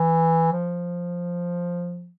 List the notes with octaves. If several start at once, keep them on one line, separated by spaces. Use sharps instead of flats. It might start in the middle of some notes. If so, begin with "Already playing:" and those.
Already playing: E3
F3